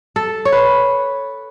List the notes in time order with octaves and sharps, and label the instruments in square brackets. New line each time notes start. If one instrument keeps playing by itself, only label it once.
[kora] A4
C#5
B4